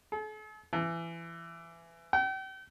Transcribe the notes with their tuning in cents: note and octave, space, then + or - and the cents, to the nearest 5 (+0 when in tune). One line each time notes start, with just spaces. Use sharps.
A4 -45
E3 +25
G5 -40